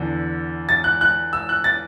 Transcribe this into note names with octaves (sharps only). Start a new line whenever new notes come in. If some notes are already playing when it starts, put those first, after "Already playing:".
Already playing: E2 D3
A6
F#6
F#6
E6
F#6
A6